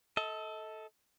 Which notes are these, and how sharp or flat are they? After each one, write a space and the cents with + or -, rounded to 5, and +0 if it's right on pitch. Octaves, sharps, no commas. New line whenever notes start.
A4 +0 D#5 +40